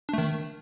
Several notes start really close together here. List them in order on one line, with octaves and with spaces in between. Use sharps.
D4 A3 D#3